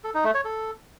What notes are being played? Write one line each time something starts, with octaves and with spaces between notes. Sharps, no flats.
A4
D#4
A3
C#5
A4